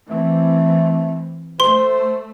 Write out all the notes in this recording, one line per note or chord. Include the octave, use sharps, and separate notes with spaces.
E3 A3 C4
A3 C5 C6 G7